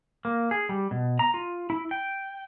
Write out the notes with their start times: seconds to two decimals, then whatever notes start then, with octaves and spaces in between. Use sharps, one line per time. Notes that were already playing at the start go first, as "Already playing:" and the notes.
0.25 A#3
0.51 G#4
0.69 G3
0.91 B2
1.19 A#5
1.34 F4
1.70 E4
1.91 G5